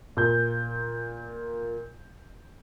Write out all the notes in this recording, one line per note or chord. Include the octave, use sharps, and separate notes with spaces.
A#2 G6